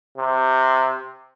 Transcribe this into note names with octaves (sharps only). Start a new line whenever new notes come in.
C3